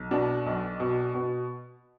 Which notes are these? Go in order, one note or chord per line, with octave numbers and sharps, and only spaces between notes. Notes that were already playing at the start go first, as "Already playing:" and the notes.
Already playing: B1
B2 D4
B1
B2
B2